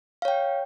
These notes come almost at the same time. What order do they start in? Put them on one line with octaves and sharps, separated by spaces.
F5 C#5 G5